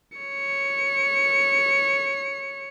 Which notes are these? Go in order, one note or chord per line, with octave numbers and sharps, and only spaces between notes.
C#5 C#7